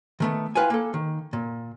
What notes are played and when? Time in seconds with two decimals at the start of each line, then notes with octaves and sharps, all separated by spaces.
0.20 D#3 A3 B3
0.55 E4 F4 B4 F5 G5 G#5
0.70 A#3 A4
0.94 D#3
1.33 A#2